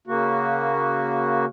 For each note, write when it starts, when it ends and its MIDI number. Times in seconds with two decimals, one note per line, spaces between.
0.07 1.45 49
0.07 1.45 58
0.07 1.45 66